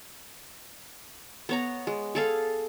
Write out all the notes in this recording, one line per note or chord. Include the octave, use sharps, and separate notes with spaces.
B3 C#5 A#5
G#3
G#4 A4 F5